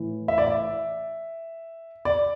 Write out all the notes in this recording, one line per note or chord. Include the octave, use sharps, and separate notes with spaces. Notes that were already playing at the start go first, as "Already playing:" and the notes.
Already playing: A2 E3
E5
D5
E5
D5